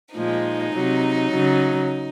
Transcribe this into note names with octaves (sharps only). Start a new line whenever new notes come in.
A#2 F3 G#3 D#4
C3 F#3
C#3 F#3